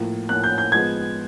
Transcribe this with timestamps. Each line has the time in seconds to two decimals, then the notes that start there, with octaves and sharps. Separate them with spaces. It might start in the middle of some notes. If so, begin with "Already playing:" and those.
Already playing: A2 F3 A#3
0.29 A2 F3 A#3 F#6
0.44 G6
0.58 G6
0.72 F3 G#3 B3 G#6